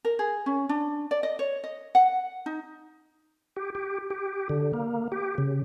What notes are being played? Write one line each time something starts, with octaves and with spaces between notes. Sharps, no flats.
A#4
G#4
C#4
D4
D5
D#5
C#5
D#5
F#5
D#4
G4
G4
G4
D3
A#3
G4
C#3